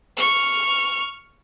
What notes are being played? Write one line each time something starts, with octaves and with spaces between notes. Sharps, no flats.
C#6 F6